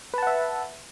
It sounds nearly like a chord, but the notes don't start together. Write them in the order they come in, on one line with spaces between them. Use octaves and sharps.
B4 A5 F#5 E5